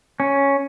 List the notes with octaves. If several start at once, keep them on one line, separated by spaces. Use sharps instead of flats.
C#4